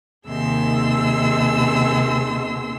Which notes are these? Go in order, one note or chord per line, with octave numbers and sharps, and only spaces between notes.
D#2 C3 D#3 G#4 C6 E6